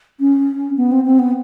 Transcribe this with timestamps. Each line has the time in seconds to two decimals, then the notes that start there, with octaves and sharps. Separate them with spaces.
0.20 C#4
0.77 B3
0.92 C4
1.05 C4
1.19 B3